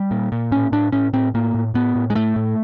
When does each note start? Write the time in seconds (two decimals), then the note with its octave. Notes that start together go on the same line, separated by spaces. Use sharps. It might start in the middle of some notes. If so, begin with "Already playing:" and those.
Already playing: G3
0.11 A#2
0.32 A#2
0.51 A2 C#4
0.72 A2 D4
0.92 A2 C#4
1.13 A2 C4
1.34 A2 A#3
1.54 A2
1.74 A2 B3
1.95 A2
2.10 G#3
2.15 A2 A3
2.36 A2